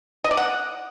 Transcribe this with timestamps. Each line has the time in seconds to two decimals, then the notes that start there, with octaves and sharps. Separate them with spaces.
0.24 D#5
0.31 D5
0.37 F#5